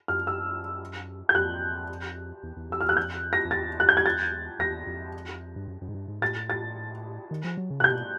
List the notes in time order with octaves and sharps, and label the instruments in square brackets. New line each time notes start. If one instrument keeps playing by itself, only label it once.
[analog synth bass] F#2 [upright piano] F6
[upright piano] E6
G6
[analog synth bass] F2 [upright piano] F#6
[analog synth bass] E2
E2
[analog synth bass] F2 [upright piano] E6
[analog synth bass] E2 [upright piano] F6
[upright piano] F#6
[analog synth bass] F2 [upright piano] G6
[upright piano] A#6
[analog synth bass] F2
[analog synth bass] E2 [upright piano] A6
[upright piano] F#6
G6
G#6
A6
[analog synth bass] E2 [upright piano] A#6
[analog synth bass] F2
G2
F#2
F#2
G#2
G2
G#2
[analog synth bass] A2 [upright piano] A6
[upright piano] A6
[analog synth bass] D#3
F3
F#3
C#3
[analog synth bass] C3 [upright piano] F#6 G6
[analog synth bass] B2